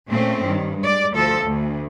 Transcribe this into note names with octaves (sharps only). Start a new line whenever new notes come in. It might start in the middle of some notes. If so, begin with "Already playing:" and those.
A#2 A3 C4 C#4
G2 D#3
G#3 D5
D2 F3 A4
D2